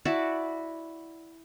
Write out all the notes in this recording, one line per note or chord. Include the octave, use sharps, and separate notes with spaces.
E4 F#4 D5 A5